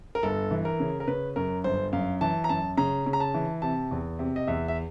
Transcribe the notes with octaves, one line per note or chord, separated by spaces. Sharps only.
A#4
G1 A4
E3
A#4
C#3
A#4
C#3 B4
F#2 A#4
G1 C5
F#2 F5
E3 A5
A#5
F#2 A5
C#3 A#5
C#3
A#5
A5
E3
C3 A5
E2
C3
D#5
E2 E5
E5